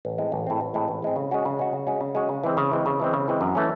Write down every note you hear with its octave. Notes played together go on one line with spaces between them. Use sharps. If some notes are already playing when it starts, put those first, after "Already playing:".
A1
A2 G#3 C4
A1
A2 G#3 C4
A1
A2 G#3 C4
A1
A2 G#3 C4
C#3
G#3 C#4 F#4
C#3
G#3 C#4 F#4
C#3
G#3 C#4 F#4
C#3
G#3 C#4 F#4
C#3
E3 G#3 C4
C#3
E3 G#3 C4
C#3
E3 G#3 C4
C#3
E3 G#3 C4
F#2
E3 A3 C#4